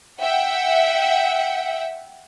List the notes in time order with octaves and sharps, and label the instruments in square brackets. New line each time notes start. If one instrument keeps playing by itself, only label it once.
[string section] E5 F#5 G5